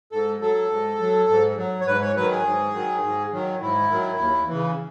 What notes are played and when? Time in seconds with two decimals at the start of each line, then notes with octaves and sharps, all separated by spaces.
0.12 G#2 A4
0.41 F#3 A4
0.70 G#2
1.00 F#3
1.29 G#2
1.57 F#3
1.81 C#5
1.87 G#2 B4
2.01 C#5
2.16 D#3 F#3 B4
2.31 G#4
2.46 G#2
2.74 D#3 F#3
3.03 G#2
3.33 D#3 F#3
3.62 G#2 E4
3.90 D#3 F#3
4.19 D#2
4.48 C#3 E3